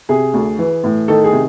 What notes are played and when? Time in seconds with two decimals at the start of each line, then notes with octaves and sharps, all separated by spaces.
0.09 C3 G#4
0.34 D2
0.59 E3
0.84 A2
1.08 D#3 A4
1.24 G#4
1.33 C3